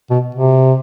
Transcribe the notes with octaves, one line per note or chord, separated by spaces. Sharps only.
B2
C3